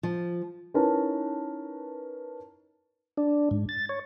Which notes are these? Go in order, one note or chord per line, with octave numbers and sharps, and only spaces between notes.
F3
C#4 D#4 E4 A#4 B4 A5
D4
G#2
A6
C#5